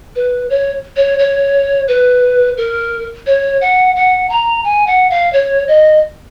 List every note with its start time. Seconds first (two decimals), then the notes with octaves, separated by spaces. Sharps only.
0.16 B4
0.50 C#5
0.96 C#5
1.19 C#5
1.88 B4
2.57 A#4
3.27 C#5
3.61 F#5
3.96 F#5
4.30 A#5
4.64 G#5
4.87 F#5
5.10 F5
5.33 C#5
5.68 D#5